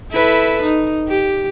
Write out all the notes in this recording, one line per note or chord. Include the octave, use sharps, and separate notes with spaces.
E4 A4 B4
D#4
G4